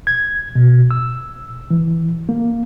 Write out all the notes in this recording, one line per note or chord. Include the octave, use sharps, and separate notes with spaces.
G#6
B2
E6
E3
A#3